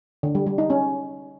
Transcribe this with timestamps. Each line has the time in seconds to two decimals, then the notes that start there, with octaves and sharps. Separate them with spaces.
0.23 D3
0.35 G3
0.47 G3
0.58 D#4
0.70 C#4